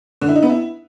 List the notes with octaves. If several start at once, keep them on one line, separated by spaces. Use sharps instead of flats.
D3
E4
D#4
B3
E4